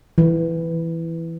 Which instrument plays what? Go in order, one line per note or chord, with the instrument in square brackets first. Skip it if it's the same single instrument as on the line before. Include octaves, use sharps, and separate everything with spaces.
[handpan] E3